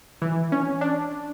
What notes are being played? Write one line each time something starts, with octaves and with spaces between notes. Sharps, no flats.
E3
C#4
D4